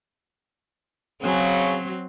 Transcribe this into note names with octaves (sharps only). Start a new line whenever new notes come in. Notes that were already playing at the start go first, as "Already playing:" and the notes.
C#3 F#3 C4